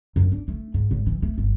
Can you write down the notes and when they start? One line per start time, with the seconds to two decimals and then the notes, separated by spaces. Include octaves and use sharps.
0.16 F#2
0.32 D4
0.48 A3
0.74 G#2
0.91 G#1
1.07 E3
1.22 A3
1.38 G1